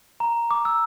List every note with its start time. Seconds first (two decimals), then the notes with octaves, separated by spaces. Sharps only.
0.20 A#5
0.51 D6
0.65 E6